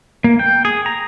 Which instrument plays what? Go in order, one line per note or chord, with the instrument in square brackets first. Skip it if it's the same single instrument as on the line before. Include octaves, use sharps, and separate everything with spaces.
[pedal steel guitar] A#3
G5
G#4
A#5